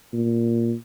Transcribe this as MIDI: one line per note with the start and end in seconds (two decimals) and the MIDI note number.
0.13 0.74 46